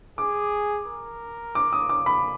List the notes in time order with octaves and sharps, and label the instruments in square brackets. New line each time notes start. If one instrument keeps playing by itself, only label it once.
[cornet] G#4 [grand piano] D6
[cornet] A#4
[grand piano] D6
D#6
D6
B5